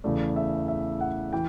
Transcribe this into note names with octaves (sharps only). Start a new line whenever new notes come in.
E2 C#3 E3 A3 D5
E5
E5
F#5
E3 G5